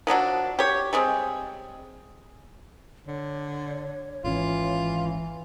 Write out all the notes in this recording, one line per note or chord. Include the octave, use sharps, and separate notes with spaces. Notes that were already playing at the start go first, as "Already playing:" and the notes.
F3 F#3 D4 F#4
G4 C#5
G3 G#3 C4
D3 C#5
G#1 C#3 E3 C#4 F4